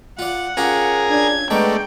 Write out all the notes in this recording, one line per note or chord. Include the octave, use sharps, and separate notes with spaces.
F4 D5 F#5
C#4 F4 G4 G#4 A#4
D4 G#6
G#3 A3 B3 D4 G5 A#5 C#6